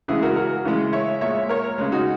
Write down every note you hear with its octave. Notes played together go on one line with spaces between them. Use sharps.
C#3 E3 G#3 E4 G#4
F#4 A#4
F#4 A#4
C#3 E3 G#3
C#5 E5
A#2 G#3 C#5 E5
A#4 C#5
C#3 G#3
D#4 F#4